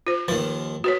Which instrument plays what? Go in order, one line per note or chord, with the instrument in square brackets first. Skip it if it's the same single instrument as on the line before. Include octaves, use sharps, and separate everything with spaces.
[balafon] F4 C5
[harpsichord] D#2 F3 [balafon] B4
[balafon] F#4 B4 C#5